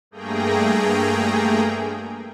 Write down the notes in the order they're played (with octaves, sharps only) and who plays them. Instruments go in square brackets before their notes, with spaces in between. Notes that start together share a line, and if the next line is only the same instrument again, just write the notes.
[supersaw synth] G2 A3 A#3 G#4 G5 A#5